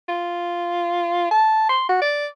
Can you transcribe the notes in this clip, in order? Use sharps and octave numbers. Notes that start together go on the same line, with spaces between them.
F4
A5
C6
F#4
D5